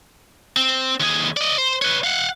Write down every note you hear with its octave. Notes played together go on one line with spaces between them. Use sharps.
C4
D#2 G#4
D5 D#5
C5
B4 C#5
F5 F#5